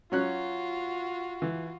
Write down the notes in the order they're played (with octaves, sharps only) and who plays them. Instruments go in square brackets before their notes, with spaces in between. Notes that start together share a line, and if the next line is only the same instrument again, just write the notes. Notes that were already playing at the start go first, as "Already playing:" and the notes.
[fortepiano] F#3 C#4 F#6 [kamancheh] F4 F#4
[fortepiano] E3